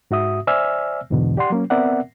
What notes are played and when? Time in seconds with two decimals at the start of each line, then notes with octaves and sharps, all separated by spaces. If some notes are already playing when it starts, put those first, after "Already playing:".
0.11 G#2 F#4 E5 D#6
0.47 C5 D5 E5 G#5 E6 F6
1.10 E2 G#2 B2 D3 E3
1.37 G4 D5 F#5 C6
1.50 F#3 A#3 C#4
1.70 B3 C4 A#4 D5 E5 F#5